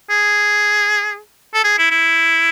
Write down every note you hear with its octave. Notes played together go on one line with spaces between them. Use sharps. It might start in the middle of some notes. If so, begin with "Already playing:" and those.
G#4
A4
G#4
E4
E4